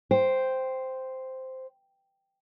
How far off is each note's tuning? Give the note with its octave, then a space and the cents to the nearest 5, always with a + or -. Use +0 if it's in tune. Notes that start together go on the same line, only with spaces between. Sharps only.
C5 -5 G5 +0